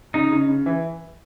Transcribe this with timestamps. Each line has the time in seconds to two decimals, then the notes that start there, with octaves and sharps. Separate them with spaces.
0.14 C#3 D#4
0.32 C#3
0.49 C#3
0.66 E3